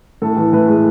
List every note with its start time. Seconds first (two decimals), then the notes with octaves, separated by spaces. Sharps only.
0.22 A2 A4
0.37 E3
0.53 A2 B4
0.68 G#3